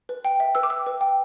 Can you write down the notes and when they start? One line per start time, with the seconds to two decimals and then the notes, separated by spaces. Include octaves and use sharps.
0.09 B4
0.25 G5
0.40 E5
0.55 B4 E6
0.63 D6
0.70 G5 E6
0.86 B4
1.01 G5